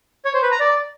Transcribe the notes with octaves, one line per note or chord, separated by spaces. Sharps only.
C#5
C5
B4
A#5
D5